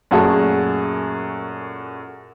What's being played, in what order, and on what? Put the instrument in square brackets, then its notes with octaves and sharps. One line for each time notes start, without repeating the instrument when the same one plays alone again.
[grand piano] F#2 A#2 A3 F#4 G#4 A5